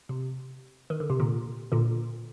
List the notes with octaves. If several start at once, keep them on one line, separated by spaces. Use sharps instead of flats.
C3
D#3
D3
C3
A#2 D3
A#2 D3